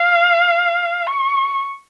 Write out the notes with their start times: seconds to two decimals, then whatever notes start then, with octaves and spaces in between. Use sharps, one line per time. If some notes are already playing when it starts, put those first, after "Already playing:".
Already playing: F5
1.07 C#6